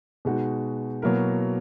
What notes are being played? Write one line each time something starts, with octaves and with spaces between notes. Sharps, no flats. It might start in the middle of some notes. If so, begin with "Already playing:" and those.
B2 G#3 D#4 F#4
B2 F#3 A#3 E4 A#4